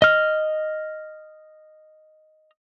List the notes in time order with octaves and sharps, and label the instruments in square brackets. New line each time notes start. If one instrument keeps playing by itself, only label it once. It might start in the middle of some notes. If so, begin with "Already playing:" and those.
[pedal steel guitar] D#5 F6